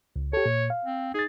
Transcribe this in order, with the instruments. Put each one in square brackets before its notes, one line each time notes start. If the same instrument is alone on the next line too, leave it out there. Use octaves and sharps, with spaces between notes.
[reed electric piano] C#2
[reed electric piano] G4 A4 [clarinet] C#5
[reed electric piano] A#2
F5
[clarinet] C4
[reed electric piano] D#4 A6 [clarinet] G#4